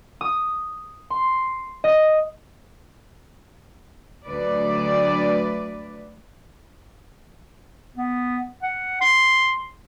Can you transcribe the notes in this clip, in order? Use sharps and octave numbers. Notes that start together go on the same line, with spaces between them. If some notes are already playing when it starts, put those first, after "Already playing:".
D#6
C6
D#5
D2 F#3 A3 B4 D5
B3
F#5
C6